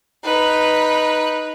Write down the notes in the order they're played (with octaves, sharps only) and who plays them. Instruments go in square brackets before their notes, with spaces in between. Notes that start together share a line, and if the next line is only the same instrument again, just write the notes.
[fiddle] D#4 B4